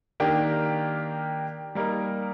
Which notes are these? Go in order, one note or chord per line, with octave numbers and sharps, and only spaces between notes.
D#3 A#3 D4 G4 A#4
G3 A#3 D#4 A#4